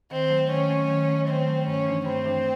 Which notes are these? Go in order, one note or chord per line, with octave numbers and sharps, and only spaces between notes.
D#3 C4
F#3 A3
D#3 C#4
F#3 A3
D#3
F#3 A3
D#3 C4
F#3 A3
G2 C#4
E3 A3 D4
G2 C4
E3 A3 D4